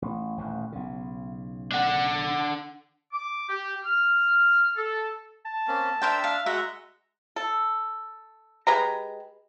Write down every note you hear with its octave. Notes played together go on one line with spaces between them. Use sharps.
A1
D#1 A1 D#2
B1 C#3
D4 F#5
D6
G4
F6
A4
A5
A#3 C4 C#4
D4 A#4 C5 E5 G5
F5
G#3 F#4 E5 F#5 A#5
A4
G#3 G4 B4 A#5